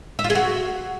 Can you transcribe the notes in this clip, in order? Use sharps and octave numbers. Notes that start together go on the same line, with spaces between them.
E5
F4
G#4
F#4